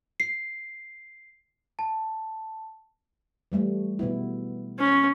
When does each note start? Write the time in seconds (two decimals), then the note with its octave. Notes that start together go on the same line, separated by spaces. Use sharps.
0.20 C7
1.79 A5
3.52 E3 G3 A3
3.99 B2 B3 E4
4.79 C#4